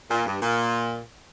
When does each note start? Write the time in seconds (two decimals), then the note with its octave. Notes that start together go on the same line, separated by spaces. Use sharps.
0.10 A#2
0.26 G2
0.42 A#2